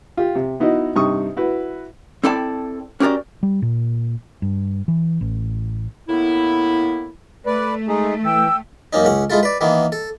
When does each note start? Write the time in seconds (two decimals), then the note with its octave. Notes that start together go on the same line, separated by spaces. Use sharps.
0.17 F4 G4
0.35 C3
0.60 B3 D#4 E4 F#4 D#5
0.96 G2 C3 D#4 C#6 D#6
1.37 E4 F#4 B4
2.24 C4 E4 A4 D5 G5 A5
3.00 C#4 F#4 G4 A#4 D5
3.43 G3
3.62 A#2
4.42 G2
4.88 E3
5.21 A1
6.09 A2 A#3 B3 E4
7.46 A3 B4 D5
7.88 G#3 D#4 G#4
8.23 E3 G5 E6
8.93 F#2 A#3 C#4 D#4
9.05 C#2 C#4 F#5
9.30 G#3 E4 F4 A4
9.43 B4 D5
9.61 D#3 E3 A#3 B3
9.92 A4